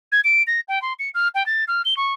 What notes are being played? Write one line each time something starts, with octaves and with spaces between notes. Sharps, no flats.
G#6
D7
A#6
G5
C6
C#7
F6
G5
A6
F6
G7
C#6